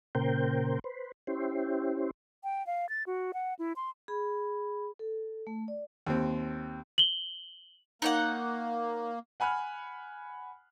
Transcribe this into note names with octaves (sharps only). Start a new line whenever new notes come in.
A#2 C#3 A#4 C5 G5
B4 C5
C#4 E4 G4 C5
G5
F5
A6
F#4
F#5
E4
C6
G#4 B5
A4
A3
D5
D#2 C4
F#7 G7
A#3 D#4 C#5 F#5
F#5 G#5 B5 F6 F#6